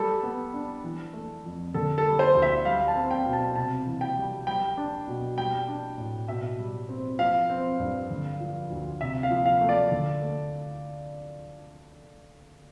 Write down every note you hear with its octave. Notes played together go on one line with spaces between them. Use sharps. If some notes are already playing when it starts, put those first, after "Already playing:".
Already playing: G3 A4
B3
D4
E3
A3
F2
D3 A4
A4
G3
C5
D2
E5
G3 F5
A5
C4
G5
B2
A5
C3 A5
E3
G5
G3
G3 G5
D4
B2
G3 G5
D4
A2
B2 E5
G3
C4
F3 F5
C4
G2
D3
F3
D2
C3 E5
F5
F3
F5
A3
D5
D3
A3